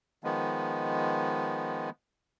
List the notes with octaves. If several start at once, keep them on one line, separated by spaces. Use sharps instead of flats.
D#3 F3 G#3 B3